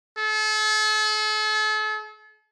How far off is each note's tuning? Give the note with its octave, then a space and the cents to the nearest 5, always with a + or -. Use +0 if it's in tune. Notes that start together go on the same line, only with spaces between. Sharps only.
A4 -40